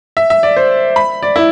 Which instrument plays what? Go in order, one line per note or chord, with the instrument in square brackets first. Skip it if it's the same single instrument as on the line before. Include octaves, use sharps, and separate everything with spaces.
[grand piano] E5
E5
D5
C5
B5
D5
E4